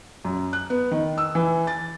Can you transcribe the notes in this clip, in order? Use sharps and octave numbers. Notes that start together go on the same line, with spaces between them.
F#2
F#6
B3
D#3
E6
E3
A6